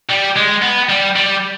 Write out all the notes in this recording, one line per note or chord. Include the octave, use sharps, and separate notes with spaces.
G3
G#3
B3
G3
G3